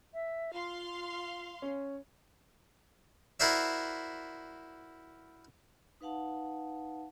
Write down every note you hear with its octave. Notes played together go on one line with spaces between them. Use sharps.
E5
F4 F5 C6
C#4
E4 F#4 A#4 C5 D5 E5
D#4 B4 F5 F#5 A5